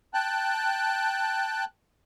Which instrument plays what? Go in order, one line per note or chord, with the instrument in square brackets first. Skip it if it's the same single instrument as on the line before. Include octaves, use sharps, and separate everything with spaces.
[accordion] G5 A5 F#6